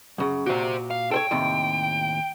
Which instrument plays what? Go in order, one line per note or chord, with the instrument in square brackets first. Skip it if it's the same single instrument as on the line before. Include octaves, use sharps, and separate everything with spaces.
[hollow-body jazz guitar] F#2 C#3
[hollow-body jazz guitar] A#2 F#4 [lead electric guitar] G4 C5
[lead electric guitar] F5
[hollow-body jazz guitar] A4 C5 C#5 [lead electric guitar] G5
[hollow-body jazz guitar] D#2 A2 C3